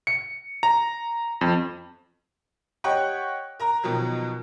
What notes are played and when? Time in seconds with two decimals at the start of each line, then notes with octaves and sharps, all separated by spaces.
0.07 C#7
0.63 A#5
1.41 F2
2.84 G4 C#5 D#5 F#5 G5 F#6
3.60 A#4 A#5
3.84 B2 D#3 F3 F#3